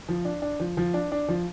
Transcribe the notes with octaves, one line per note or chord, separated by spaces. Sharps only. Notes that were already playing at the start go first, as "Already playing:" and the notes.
F3
D4
D4
F3
F3
D4
D4
F3